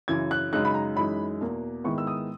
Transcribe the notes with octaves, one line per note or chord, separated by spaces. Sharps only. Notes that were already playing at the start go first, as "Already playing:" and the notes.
F#2 C#3 E3 G#6
F#6
F#2 C#3 G#3 D#4 F#6
B5
A#5
F#2 E3 G#3 D#4 B5
E2 B2 A#3
G#2 D#3 G#3 B3 E4 C#6
E6
D#6